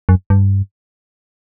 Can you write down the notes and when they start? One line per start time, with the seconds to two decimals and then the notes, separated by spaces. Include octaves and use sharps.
0.09 F#2
0.30 G2